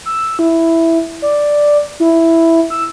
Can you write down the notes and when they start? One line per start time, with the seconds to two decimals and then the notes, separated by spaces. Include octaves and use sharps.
0.06 E6
0.39 E4
1.22 D5
2.00 E4
2.70 E6